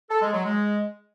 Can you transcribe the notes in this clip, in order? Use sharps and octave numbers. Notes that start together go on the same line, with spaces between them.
A4
G#3
F#3
G#3